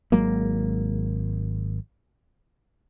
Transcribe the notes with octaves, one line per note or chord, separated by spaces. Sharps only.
G#1 F#3 G#3 A#3